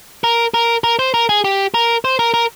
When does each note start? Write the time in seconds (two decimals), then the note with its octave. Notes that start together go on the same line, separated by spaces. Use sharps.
0.24 A#4
0.54 A#4
0.84 A#4
0.99 C5
1.14 A#4
1.29 G#4
1.44 G4
1.74 A#4
2.05 C5
2.19 A#4
2.34 A#4